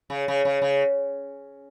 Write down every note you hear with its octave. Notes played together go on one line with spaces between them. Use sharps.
C#3
C#3
C#3
C#3